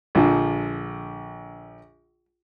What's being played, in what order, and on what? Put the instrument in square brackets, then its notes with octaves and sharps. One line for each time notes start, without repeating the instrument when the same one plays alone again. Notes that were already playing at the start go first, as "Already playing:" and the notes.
[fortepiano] A#1 D3 F3